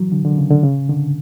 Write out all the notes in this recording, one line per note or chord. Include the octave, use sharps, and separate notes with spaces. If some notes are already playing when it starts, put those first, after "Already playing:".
Already playing: E3 F#3
D3
D3
C#3
D3
C#3
D3